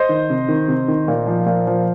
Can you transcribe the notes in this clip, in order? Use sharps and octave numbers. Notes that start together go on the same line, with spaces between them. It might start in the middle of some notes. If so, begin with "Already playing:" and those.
Already playing: C5 D#5
D#3
C3
D#3
C3
D#3
A#2
F3
A#2
F3